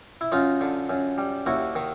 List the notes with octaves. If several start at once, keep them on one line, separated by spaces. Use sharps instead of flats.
E4
F#2 D#4 F4
D3
F#2
G3
D#2 E4 F#4
D#3